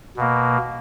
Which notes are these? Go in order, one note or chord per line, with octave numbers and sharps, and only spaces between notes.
B2 A#3